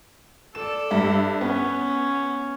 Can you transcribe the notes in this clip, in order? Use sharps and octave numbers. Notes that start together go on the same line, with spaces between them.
A4 D5 E7
G2 E5
B3 C#4